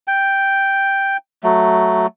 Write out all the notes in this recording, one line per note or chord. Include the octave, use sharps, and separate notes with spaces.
G5
F#3 A3